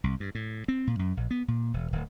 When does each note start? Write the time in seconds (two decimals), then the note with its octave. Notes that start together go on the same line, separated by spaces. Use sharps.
0.04 C2
0.20 G2
0.35 A2
0.68 C4
0.87 A#2
0.99 F#2
1.17 A#1
1.31 B3
1.48 A#2
1.74 E1
1.93 D1